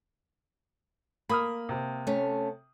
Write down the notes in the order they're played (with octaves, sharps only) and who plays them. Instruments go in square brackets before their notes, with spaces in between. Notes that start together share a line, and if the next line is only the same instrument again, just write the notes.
[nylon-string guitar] A#3 [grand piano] B5 D#6 F6
[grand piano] C3
[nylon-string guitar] A3 C#4